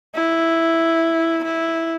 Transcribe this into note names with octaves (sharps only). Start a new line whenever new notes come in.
E4
E4